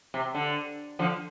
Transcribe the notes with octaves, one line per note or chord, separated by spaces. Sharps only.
C3
D3
D3 F3